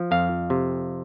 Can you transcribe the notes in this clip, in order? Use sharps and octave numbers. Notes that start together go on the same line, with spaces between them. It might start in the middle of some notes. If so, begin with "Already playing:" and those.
Already playing: F3
F2 F5
C3